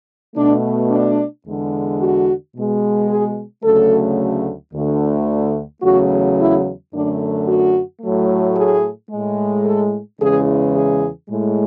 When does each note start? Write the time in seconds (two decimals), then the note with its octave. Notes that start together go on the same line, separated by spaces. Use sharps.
0.36 B2 A3 D4
0.91 D4
1.45 E2 D3 G#3
2.00 F#4
2.55 B2 G#3
3.09 G#4
3.64 D2 C#3 F#3 A3 A4
4.74 D2 D3 A3
5.83 E2 C#3 F#3 A3 F#4
6.38 E4
6.92 F#2 D3 A3 D4
7.47 F#4
8.01 A2 F#3 A3
8.56 G#4
9.11 A2 G#3
9.65 A4
10.20 E2 C#3 E3 G#3 G#4
10.75 G#4
11.29 A2 G#3